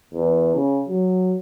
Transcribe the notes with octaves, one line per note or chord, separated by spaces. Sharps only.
E2
C#3
F#3